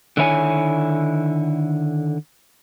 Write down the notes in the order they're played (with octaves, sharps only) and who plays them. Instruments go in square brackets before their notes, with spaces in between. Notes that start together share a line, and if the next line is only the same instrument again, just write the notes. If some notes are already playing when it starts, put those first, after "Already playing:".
[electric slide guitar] D3 D#3 E4 C#5 G#5